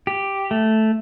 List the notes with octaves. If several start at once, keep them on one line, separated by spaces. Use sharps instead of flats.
G4
A3